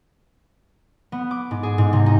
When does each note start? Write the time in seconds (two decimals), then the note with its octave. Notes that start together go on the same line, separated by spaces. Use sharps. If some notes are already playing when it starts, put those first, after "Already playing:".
1.12 B3
1.31 D6
1.51 G#2
1.63 G#4
1.78 G#2
1.93 C3
2.06 D#4